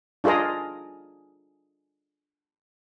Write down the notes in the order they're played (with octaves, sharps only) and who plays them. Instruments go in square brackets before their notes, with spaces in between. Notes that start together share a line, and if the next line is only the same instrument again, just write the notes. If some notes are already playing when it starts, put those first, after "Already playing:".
[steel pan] D4 F4 G#4 A#4 D#5